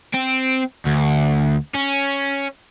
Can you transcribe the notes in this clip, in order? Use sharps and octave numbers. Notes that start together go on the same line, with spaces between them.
C4
D2
C#4